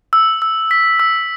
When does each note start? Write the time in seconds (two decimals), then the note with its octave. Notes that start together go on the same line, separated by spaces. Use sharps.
0.13 E6
0.42 E6
0.71 B6
1.00 E6